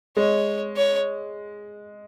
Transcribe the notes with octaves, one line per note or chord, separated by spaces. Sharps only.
G#3 C#5
C#5